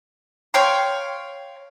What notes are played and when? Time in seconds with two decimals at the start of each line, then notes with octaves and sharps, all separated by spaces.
0.54 C#5 F5 G5 C6